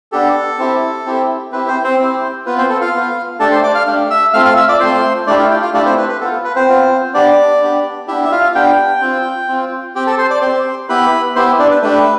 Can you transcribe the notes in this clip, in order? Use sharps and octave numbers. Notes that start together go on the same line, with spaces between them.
B3 D4 G4 A4
C4 E4 G4
C4 E4 G4
C4 E4 G4 B4
C4 C5
C4 C5
C4 E4 G4
B3 F4 B4
C4 C5
A4
F4 F5
B3 F4
A3 D4 G4 A4 A5
C5 C6
D5 D6
F5 F6
A3 D4 G4
E5 E6
A3 C4 F4 F5 F6
F5 F6
E5 E6
D5 D6
A3 C4 F4 C5 C6
A3 D4 E4 G4 D5
F4 F5
G4 G5
F4 F5
A3 D4 E4 G4 D5
C4 C5
B4
B4
B3 F4 A4
B4
C4 C5
B3 F4
B3 D4 G4 D5
B3 D4 G4
B3 D4 E4 G4 E5
E5
F4 F5
B3 D4 G4 G5
C4 F4
C4 F4
C4 G4 G5
A4 A5
C5 C6
D5 D6
C4 G4 C5 C6
B3 E4 G4 B4 B5
B3 E4 G4 C5 C6
D4 D5
B4
A3 D4 G4 B4